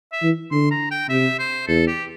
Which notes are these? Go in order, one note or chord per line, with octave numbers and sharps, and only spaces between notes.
E5
E3
D3 C6
A#5
G5
C3 E5
C5
E2 A4
G4